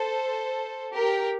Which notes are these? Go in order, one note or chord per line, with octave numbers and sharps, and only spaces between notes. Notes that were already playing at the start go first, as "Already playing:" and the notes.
Already playing: A4 C5
G4 A#4